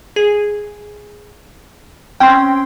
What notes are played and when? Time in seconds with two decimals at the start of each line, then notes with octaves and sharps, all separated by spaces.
0.16 G#4
2.20 C4 C#4 G5 C6